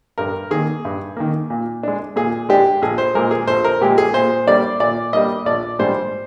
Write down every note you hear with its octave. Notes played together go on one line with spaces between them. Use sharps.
G2 A#4
D#3 A#3 G#4
G2
D#3 A#3
A#2
G#3 D4
A#2 G#4
G#3 D4 G4
A#1 G#4
C5
A#2 G#3 A#4
G#4
A#1 C5
A#4
A#2 G#3 G4
G#4
A#2 C5
G3 A#3 D4 D5
A#2 D5
G3 A#3 D4 D#5
A#1 D5
G#2 G3 D4 C5